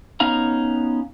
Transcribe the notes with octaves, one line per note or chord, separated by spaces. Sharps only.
B3 C#4 D#4 F5 A#5